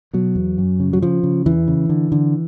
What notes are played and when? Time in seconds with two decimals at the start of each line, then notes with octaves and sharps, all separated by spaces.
0.13 B2 F#3
0.35 E2
0.58 F#2
0.80 C#3
0.93 F#3
1.02 C#3 F3
1.23 C#3
1.46 E2 E3
1.67 C#3
1.89 D3
2.12 D3